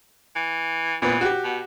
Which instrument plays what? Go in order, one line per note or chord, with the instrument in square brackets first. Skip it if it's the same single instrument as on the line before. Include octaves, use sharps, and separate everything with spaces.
[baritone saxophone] E3
[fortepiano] A#2 B3 [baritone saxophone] E3
[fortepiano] F#4 G4
[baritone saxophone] B2